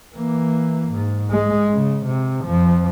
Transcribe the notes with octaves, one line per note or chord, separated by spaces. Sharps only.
E3 A#3
G#2
G#3
C#3
C3
F2 F3